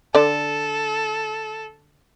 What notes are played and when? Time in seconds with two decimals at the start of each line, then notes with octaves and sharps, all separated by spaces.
0.15 D3 A4 D5